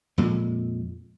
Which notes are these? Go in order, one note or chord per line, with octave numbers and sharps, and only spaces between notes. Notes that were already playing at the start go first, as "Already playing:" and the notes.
F2 A#2 G#3